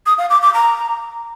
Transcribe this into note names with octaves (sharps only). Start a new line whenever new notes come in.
D#6
F5
D6
D6
A#5